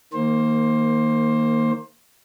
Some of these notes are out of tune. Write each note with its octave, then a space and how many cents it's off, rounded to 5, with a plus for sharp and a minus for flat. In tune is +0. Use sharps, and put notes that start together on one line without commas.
D#3 +0 A#3 -10 C5 +20